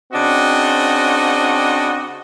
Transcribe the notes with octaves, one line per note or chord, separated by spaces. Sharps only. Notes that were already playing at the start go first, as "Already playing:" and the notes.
C#3 C4 D4 F#4 D#5